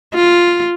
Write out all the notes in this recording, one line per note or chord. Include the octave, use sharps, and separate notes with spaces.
F4